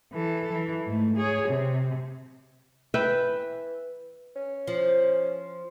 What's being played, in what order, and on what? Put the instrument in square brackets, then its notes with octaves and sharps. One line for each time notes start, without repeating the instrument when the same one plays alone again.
[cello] E3 A4
E3
G#2 A3
G#4 C#5
C3
[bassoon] E3 [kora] B4 E5 G5
[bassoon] C#4
[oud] F3